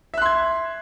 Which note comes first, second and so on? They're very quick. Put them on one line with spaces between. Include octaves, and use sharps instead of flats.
E5 F#6 C6 G#6